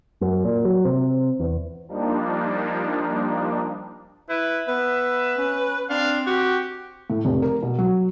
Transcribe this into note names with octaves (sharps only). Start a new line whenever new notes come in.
F#2
A#2
F#3
C3
E2
F3 G3 A#3 D4 D#4
E4 B4
B3 B4 E5
C#4
C4 D4 F5
F#4 G4
A2
F1
A#4
B2
F#3